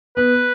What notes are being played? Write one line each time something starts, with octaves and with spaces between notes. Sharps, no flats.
B3 B4